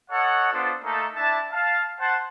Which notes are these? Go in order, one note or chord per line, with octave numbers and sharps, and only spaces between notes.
A4 C#5 D#5 F#5
B3 D4 F4 A4 C5
A3 A#3 D#4 A4
D4 E4 E5 A5
F5 A5
C5 F#5 A5